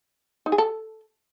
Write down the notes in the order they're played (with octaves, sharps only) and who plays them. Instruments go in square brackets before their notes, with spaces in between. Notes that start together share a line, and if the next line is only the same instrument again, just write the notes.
[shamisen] D#4
G#4
A4